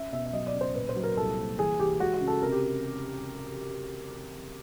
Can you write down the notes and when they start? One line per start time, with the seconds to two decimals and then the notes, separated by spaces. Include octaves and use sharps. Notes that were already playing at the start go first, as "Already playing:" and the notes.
Already playing: C#4 E5
0.12 B2 E5
0.25 E5
0.33 F#3 D#5
0.47 D5
0.53 C#3
0.61 C5
0.75 A#2 B4
0.89 C5
0.96 F#3
1.03 A#4
1.17 C2 A4
1.37 A#3
1.59 E3 G#4
1.79 E3 G4
2.00 G#3 F#4
2.14 F#4
2.21 C#3
2.28 A4
2.42 C3 A#4
2.52 G4